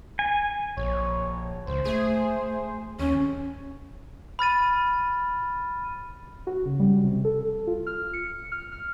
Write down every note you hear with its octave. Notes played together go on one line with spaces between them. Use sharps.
G#5
A#1 C#5
C#2 C5
A3 G#4
D#2 C#4 C#5
B5 F6 A6 D#7
F#4
C#3
G3
C3
A4
F4
F6
C#7
F6
F6